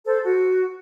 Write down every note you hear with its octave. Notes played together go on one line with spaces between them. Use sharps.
A4 C5
F#4